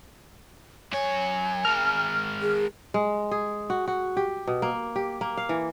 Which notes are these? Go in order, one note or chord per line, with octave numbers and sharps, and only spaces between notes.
F#2 C#5 G#5
G#3 A#4 F6
G#4
G#3
G#4
F#4
F#4
G4
B2
A#3
G4
A#3
F5
E3